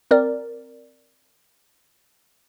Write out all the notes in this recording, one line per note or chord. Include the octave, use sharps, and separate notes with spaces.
C4 A#4 D5